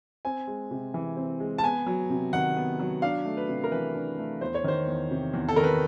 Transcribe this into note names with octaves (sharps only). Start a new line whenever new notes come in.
C4 G#5
G#3
C3
E3
C4
G#3
A5
B3 G#5
F#3
C3
D#3 F#5
B3
F#3
D4 F5
A3
B4
C3
A#4
E3 B4
D4
A3
E2 C5
C#5
D#3 C5
E2
C3
E2
A4
D#3 A#4
B4